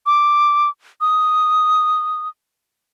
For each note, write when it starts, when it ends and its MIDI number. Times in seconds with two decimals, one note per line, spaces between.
0.06 0.69 86
1.01 2.28 87